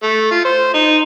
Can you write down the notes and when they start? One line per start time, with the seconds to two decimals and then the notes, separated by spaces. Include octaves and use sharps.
0.03 A3
0.31 F4
0.45 C5
0.74 D#4